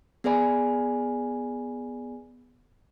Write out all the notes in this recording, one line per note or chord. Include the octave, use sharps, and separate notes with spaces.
B3 G#4 B4 D5 G#5 B5